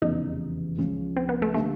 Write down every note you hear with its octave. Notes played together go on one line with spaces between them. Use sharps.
F1 E2 C#3 E3 G3 D#4
C#2 C#3 F3 G#3 C#4
C4
B3
A3
D3 G3 A3 A#3